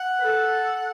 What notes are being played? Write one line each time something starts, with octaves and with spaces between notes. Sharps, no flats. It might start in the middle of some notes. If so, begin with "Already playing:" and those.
Already playing: F#5
B4
A4